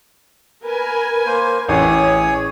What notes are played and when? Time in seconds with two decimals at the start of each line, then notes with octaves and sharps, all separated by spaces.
0.63 A#4 B4 G#5
1.26 A#3 C5
1.69 A1 C#4 G#4 C#5 D#6